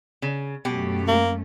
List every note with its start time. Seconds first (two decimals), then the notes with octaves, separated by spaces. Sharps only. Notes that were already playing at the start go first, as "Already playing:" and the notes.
0.22 C#3
0.65 F#2 B2 A3 C#4 G4
1.08 A#3